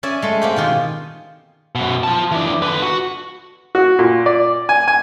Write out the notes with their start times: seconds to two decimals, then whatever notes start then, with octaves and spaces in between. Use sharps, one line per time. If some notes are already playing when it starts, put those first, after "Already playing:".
0.03 C#4 D5 E5 G#5
0.22 G#3 A3
0.41 A#3 C4 G4
0.56 B2 D#3 F4
1.75 F#2 B2
2.03 F4 A5
2.32 E3 D4
2.62 D3 B4
2.83 F#4
3.75 F#4
3.99 A#2
4.26 D5
4.69 G#5
4.88 G#5